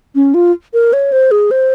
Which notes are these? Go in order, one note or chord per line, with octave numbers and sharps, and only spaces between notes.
C#4
F4
A#4
C#5
C5
G#4
C5